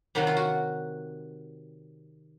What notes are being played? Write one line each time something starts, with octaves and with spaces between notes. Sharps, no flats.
C3 D#3 F#3 F#4
F4
F#4